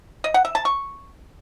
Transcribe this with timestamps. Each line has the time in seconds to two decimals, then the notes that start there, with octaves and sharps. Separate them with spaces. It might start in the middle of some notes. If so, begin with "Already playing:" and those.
0.24 D#5
0.34 F#5
0.45 E5
0.55 A5
0.65 C#6